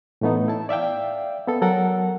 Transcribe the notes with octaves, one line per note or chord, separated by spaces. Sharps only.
A2 E3 A3 B3 D#4
E4 A5
D5 E5 F5 G5
B3 A4
F#3 A4 A#4 F#5